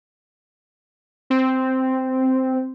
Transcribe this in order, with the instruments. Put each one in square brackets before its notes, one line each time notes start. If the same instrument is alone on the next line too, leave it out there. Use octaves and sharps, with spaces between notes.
[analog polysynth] C4